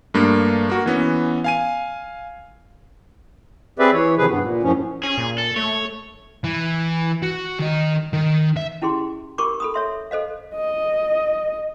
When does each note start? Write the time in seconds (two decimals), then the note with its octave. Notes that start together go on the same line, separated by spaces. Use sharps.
0.14 G2 A3 A#3 D4
0.70 A#3 F#4
0.86 E3 B3 C#4
1.44 F5 G#5 D#7
3.79 C4 G4 G#4 B4 D5 E5
3.93 E3 C#5
4.18 C3 D#3 F3 G#4 B4
4.30 G2 B3
4.42 A#2
4.63 F#2 A2 F3 C#4
5.03 C#4 G#4
5.18 A#2
5.38 A4
5.56 A3 C#5
6.44 E3
7.23 F#4
7.59 D#3 D#5
8.13 D#3
8.57 E5
8.82 C#4 E4 G4 G#4 C6
9.38 G4 A#4 B5 C#6 D6
9.60 A4 B5 D#6
9.74 C#5 E5 C6
10.11 A4 C5 D#5 F5
10.55 D#5